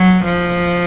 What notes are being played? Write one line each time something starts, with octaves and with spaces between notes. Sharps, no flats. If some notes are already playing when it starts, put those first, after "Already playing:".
Already playing: F#3
F3